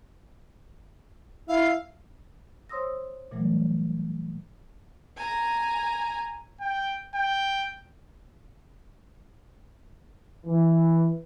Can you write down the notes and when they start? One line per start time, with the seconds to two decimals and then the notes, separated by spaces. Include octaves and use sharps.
1.49 E4 F5
2.69 C5 C#5 C6 D#6 E6 A#6
3.31 A#2 E3 F#3 G3 A3
5.16 G#5 A#5
6.61 G5
7.15 G5
10.46 E3